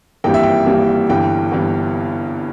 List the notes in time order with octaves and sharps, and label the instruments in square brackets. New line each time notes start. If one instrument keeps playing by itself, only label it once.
[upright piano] G#1 G2 E3 G3 A#3 G5
E5
G5
G#1 G2 E3 G3 A#3
G1 G2 E3 G5
G1 G2 E3